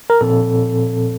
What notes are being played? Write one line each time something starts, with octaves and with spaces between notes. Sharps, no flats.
A#4
A#2 F3 C4 A4